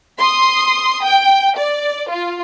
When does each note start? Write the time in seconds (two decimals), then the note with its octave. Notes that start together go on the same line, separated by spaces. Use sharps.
0.18 C6 D#6
1.04 G5
1.57 D5
2.10 F4